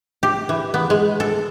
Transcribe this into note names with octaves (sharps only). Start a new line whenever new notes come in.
G4
E3
B3
G#3
A4